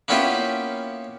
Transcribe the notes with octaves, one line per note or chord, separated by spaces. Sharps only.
A#3 B3 C#4 E4 F4 G4